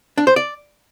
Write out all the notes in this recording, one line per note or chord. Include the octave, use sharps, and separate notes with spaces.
D4
C5
D5